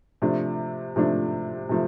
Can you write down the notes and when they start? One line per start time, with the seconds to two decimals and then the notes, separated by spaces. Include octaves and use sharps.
0.22 C3 F3 A3 D4
0.96 C3 F3 A3 D4
1.69 C3 F3 A3